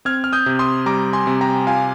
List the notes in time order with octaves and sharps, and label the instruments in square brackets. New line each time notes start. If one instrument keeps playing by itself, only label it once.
[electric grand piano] C4 F6 G#6
F6
D#6 G6
C3
C6 D#6
G3 A#5 D6
G#5 C6
C3
G5 A#5
F4 F5 G#5